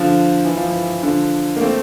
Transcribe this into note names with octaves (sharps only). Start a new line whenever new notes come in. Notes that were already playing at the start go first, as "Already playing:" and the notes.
Already playing: D3 F3
E3
F3
E3
D3 F3
A#3
A3 C4